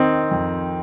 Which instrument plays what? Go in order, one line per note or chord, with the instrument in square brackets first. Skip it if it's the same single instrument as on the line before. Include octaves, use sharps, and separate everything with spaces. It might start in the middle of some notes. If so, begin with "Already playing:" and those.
Already playing: [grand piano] D#3 C4 D#4
F2